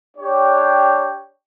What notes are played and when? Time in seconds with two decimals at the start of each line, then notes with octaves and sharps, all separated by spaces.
0.15 D4 G4 C#5 G5